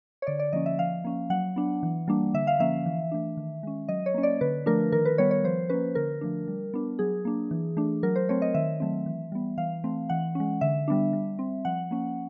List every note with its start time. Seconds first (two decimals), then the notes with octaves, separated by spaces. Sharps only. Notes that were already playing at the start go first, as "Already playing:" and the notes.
0.22 C#5
0.27 D3 D5
0.39 D5
0.53 F3 A#3 C#4 D#5
0.66 E5
0.79 F3 F5
1.04 A#3 C#4
1.30 F#3 F#5
1.56 B3 D4
1.83 E3
2.08 G3 A#3 D4
2.34 D3 E5
2.47 F5
2.60 F3 A#3 C#4 E5
2.86 E3
3.12 A3 D4
3.37 D#3
3.63 G#3 C#4
3.88 F#3 D#5
4.06 C#5
4.14 A#3 C#4
4.23 D5
4.41 D3 B4
4.66 F3 A3 D4 A#4
4.92 D#3 A#4
5.05 B4
5.18 G3 B3 C#5
5.31 C#5
5.44 F3 C5
5.69 A#3 C#4 B4
5.95 D3 A#4
6.21 F3 A3 D4
6.48 G3
6.74 B3 D4
6.99 F#3 G#4
7.25 A#3 D4
7.51 E3
7.77 A3 D4
8.03 F#3 A#4
8.16 C5
8.29 A3 C4 C#5
8.42 D#5
8.54 D#3 E5
8.80 F#3 A3 C4
9.06 E3
9.32 G3 B3
9.58 E3 F5
9.84 A3 C4
10.09 E3 F#5
10.35 G#3 C#4
10.61 D3 E5
10.88 G3 B3 D4
11.13 G3
11.39 C4
11.65 F3 F#5
11.91 A#3 C#4